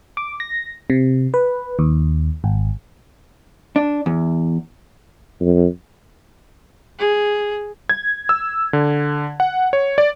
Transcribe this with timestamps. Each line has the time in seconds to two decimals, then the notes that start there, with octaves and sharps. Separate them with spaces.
0.17 D6
0.40 A#6
0.90 C3
1.34 B4
1.79 D#2
2.44 G#1
3.76 D4
4.06 E2
5.41 F2
6.99 G#4
7.89 G#6
8.29 E6
8.73 D3
9.40 F#5
9.73 C#5
9.98 D5